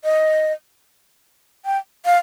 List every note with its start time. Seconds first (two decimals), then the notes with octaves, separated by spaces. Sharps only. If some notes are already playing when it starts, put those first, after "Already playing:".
0.04 D#5
1.66 G5
2.05 F5